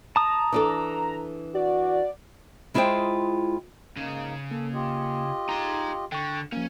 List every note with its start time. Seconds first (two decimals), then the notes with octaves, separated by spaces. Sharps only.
0.16 A5 A#5 D#6
0.53 E3 D4 A4
1.55 F#4 D5
2.74 G#3 E4 F4 G#4 C5 G5
3.97 G#2 C#3 A#3 D#4
4.51 A#3 A4
4.74 F4 G4 D#5
5.49 D#4 A#5 C6
6.12 D3 G5 C#6
6.52 F3 A#3 C#4